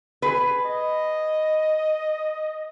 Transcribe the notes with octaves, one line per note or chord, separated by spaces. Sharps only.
G#4 B4
D#5